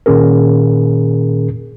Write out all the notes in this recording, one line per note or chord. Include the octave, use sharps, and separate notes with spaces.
A#2 D#3 C#4 G#4 A#4